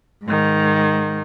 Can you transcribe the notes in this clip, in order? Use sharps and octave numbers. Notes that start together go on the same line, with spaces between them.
G#2 D#3